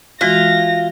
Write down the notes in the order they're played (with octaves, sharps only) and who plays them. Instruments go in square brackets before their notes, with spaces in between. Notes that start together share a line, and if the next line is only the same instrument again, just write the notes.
[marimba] E3 G#3 F#4 [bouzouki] F4 [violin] A#6